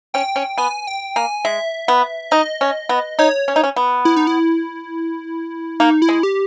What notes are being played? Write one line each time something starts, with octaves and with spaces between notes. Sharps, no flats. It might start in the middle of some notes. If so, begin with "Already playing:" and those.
C#4 G5
C#4
B3 G#5
G5
A#3 G#5
G#3 E5
B3
D#4 D#5
C#4
B3
D#4 C#5
C#4
D#4
C#4
B3
E4
D#4
E4
A#3 D#4
E4
G#3
G4